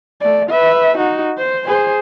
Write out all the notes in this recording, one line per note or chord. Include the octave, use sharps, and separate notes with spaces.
A3 D5
B4 E5
D#4 F#4
C5
G#4 C5